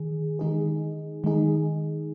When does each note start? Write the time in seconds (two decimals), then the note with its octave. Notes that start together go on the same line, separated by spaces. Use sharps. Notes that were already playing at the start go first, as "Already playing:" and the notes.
Already playing: D#3 G#4
0.39 D#3 G#3 D#4 G#4
1.24 D#3 G#3 D#4 G#4